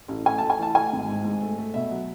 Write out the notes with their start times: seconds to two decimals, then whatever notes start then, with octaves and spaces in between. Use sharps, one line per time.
0.08 A1
0.25 A3 G#5
0.38 A3 A5
0.50 G#5
0.59 E3 A5
0.75 A3 G#5
0.92 G#1
1.08 G#2
1.24 G#2
1.41 A3
1.58 A3
1.74 B2 E5
1.91 F#3